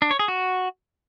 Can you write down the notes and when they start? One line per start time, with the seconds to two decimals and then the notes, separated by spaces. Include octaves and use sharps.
0.02 D4
0.11 C#5
0.19 G#4
0.28 F#4